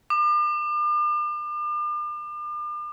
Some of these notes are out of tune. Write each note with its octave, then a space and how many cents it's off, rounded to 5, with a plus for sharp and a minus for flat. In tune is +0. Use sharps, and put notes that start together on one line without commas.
D6 +40